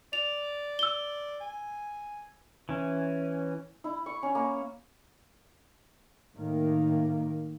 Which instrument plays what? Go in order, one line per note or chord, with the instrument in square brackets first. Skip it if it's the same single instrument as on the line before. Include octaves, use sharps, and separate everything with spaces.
[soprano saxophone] D5 [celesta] F7
[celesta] E6 G7
[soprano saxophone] G#5
[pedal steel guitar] E3 C#4
[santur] E4
C#6
C#4
A#3
[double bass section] A2 D#3 A#3